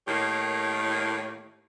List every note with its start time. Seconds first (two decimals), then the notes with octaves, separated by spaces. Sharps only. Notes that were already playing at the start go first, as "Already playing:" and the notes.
0.07 A2 D#3 A#3 G4 C#5